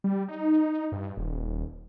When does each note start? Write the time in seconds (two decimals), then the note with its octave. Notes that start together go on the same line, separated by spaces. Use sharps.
0.04 G3
0.28 D#4
0.92 G2
1.17 D#1